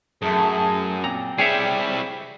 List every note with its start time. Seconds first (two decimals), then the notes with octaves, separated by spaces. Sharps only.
0.22 F#2 A2 A3 G#4
1.04 A#2 C4 A#5
1.38 G3 E4 G#4 C#5 E5 G5